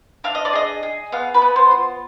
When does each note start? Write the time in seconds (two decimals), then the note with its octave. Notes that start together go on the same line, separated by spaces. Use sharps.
0.24 D4 F5
0.35 D#5
0.45 D5
0.53 G#4 D#5
0.83 G#4
1.12 B3 F5
1.34 B4
1.42 B3
1.56 C5
1.71 F4